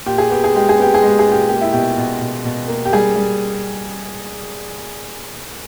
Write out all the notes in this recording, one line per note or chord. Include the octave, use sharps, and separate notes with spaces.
A#2 G4
G#4
B3 G4
G#4
G#3 G4
G#4
B3 G4
G#4
G#3 G4
G#4
A#2
G4
A#3 G4
E4
B2 G4
B2
B2
B2
A#3
G4
G3 G#4
G3